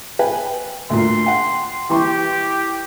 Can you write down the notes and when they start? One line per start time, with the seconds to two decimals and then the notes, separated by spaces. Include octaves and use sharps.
0.19 B4 G5 G#5
0.90 D2 A#2 C6
1.26 F#5 G5
1.90 E3 G4 C6 C#6